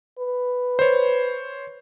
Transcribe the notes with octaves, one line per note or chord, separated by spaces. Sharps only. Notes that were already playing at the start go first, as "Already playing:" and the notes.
B4
C5 C#5